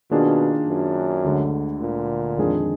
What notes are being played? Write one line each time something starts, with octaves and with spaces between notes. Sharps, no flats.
B2 D#3 A#3 D4 F4 G#4
F#2
D2 D3 G#3
A#2
F2 D#3 G#3 D4 G#4